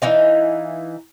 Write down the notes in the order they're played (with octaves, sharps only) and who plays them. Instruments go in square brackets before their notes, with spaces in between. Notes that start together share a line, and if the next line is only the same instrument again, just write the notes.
[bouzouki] E3 D#4 F5